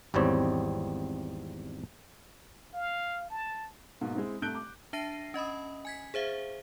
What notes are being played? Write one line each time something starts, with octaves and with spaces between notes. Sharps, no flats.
G#1 E2 G3 C4 C#5
F5
A5
G#2 B2 A#3
G#3 C4 E4
C2 A3 F#6 G6 D7 G7
D6
D4 E5 A5 A#6 C7 D#7
C#4 D#5 B5 D#6
G#5 G#6 B6
G#4 C5 E5 F5